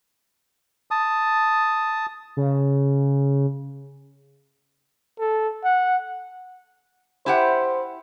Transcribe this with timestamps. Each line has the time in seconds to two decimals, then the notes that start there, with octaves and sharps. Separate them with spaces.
0.91 A5 D#6
2.37 C#3
5.19 A4
5.64 F#5
7.26 E4 G4 C5 F#5